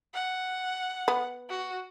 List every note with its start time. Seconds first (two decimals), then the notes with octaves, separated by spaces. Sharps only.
0.14 F#5
1.08 B3
1.49 F#4